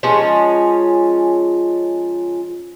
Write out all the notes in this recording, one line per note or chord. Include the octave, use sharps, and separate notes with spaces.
F3 G#3 C#4 D#4